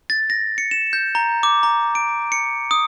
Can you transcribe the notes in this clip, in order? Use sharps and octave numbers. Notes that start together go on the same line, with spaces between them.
A6
A#6
C#7
E7
G6
A#5
D6
A#5
D7
C#7
D#6